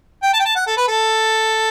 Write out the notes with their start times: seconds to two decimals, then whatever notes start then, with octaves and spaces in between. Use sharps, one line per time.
0.22 G5
0.34 A5
0.40 G5
0.45 A5
0.55 F#5
0.67 A4
0.77 B4
0.88 A4